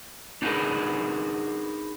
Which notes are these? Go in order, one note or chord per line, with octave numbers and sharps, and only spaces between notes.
D4 D#4 F#4 G#4 A#4 B4